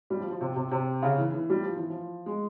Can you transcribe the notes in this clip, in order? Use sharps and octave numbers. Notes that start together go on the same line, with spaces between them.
G3
F3
F3
C3
C3
C3
C#3
E3
E3
G3
F3
E3
F3
G#3